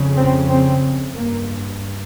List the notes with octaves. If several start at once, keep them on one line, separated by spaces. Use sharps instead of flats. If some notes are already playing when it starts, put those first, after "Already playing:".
Already playing: F2 C#3
C4
C4
G2 A#3